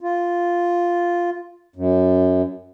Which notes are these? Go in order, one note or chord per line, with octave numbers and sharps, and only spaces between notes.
F4
F#2